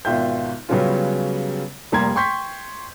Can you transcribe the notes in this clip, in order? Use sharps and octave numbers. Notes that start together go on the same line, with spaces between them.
G#1 B2 F4 E5 G5 G6
C#3 F#3 G3 B3 C#4 F4
F1 G3 A#3 A#5 C6 G#6
G5 C6 C#6 G6 B6